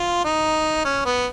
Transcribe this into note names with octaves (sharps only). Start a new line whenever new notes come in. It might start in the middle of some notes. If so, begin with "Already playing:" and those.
Already playing: F4
D#4
C#4
B3